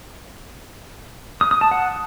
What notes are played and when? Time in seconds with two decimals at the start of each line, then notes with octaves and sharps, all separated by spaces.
1.41 D#6
1.51 D#6
1.61 A5
1.71 F#5